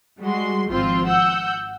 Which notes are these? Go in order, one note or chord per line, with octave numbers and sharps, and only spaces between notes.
G3 G#3 F#4 C6
G#1 F3 C4 F4 C6
F#5 E6 G6